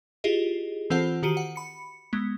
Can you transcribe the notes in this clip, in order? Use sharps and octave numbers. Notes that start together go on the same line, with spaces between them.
E4 F4 G4 G#4 D#5
E3 C4 F4 A4 C5 F#5
D#3 F#4 G4 C#7 D#7
F#5
B5 C#7
G#3 B3